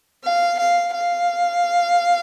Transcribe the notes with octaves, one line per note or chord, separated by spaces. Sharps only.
F5
F5
F5